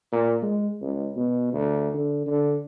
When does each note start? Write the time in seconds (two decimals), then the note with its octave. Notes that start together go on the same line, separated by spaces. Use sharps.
0.12 A#2
0.42 G#3
0.82 C#2
1.16 B2
1.53 D2
1.94 D3
2.27 D3